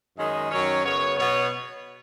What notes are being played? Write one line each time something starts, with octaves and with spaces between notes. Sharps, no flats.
F#2 D#3 G#3 C#4 D#5
F#2 D#3 F#3 C#4 C#5
F#2 C#3 B3 C#5
B2 B3 C#5